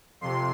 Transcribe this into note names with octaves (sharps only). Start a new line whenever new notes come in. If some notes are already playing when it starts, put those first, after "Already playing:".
F2 C3 C6